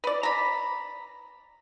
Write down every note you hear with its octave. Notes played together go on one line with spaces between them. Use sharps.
B4 D5
A#5 B5